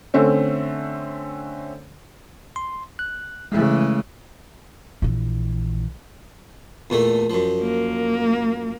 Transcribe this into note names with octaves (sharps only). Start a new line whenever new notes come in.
D3 A3 C4 C#4
C6
F#6
C#3 E3 G#3 A3
A#1 E3
E2 A#2 A3
F#2 F3
A#3